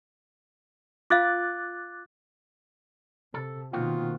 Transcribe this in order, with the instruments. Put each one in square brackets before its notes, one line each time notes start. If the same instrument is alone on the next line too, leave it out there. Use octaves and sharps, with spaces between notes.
[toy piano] F4 F5 [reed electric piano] D6 F#6 A6
[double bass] C3 [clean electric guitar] A4
[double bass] B2 D#3 [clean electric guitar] A#3 C4 F#4 [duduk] F4